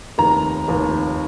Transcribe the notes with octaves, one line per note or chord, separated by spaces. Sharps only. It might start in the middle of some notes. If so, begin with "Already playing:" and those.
F1 D#2 D#3 A#5
F1 D#2 D#3